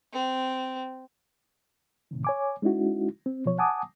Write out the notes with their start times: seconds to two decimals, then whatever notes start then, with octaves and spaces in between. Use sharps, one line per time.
0.12 C4
2.11 A2 C3 D#3
2.25 C#5 G#5 D6
2.62 G#3 C#4 D#4 E4 F#4
3.26 C4
3.45 B2 F3 C#5
3.58 F#5 G#5 A5 D6 D#6